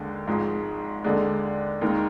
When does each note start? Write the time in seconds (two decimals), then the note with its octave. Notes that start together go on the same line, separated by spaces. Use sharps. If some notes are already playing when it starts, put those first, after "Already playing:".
Already playing: D#2 D3 G#3
0.27 G#1 G#2 F3 G#3
1.04 D#2 D3 G#3 D5
1.81 D#2 D#3 G#3 A#4